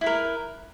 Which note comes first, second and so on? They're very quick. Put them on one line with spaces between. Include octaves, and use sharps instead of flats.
E4 B4 A#4